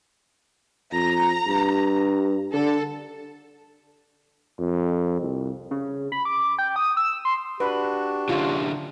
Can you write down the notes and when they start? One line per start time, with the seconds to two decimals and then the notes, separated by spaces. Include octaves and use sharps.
0.92 F2 A#5
1.47 G2
2.53 D3 A4
4.59 F2
5.21 C2
5.71 C#3
6.12 B5
6.25 D6
6.58 G5
6.76 D#6
6.97 E6
7.25 C6
7.60 D4 F#4 G4 B4
8.29 D3 C#4 E4 F4